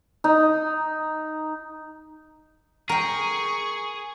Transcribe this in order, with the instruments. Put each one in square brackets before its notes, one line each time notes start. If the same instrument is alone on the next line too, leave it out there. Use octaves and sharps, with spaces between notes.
[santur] D#4
[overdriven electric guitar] G#4 [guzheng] A#4 G5 [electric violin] C#6